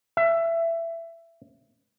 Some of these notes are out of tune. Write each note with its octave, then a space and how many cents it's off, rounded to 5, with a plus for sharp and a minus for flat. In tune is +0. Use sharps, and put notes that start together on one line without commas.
E5 +20